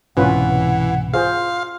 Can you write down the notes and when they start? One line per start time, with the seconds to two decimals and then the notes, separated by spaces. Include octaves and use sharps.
0.17 C2 G#2 B2 E3 C#4 F4 B4 F#5
1.14 F4 G#4 C5 F5